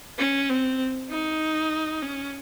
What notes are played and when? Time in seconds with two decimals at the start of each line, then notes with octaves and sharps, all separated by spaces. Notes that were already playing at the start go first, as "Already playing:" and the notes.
0.18 C#4
0.49 C4
1.10 D#4
2.02 C#4